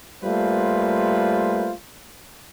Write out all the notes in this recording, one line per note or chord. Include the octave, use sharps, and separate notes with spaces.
G3 A3 A#3 F4 B4 C5